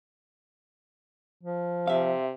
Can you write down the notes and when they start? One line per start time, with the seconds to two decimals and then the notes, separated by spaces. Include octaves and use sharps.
1.43 F3
1.87 C3 E5 F5